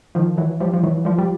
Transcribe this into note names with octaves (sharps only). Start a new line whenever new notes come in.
D#3 F3
E3 F#3
F3 G3
F3
E3 F#3
F3 G3
G3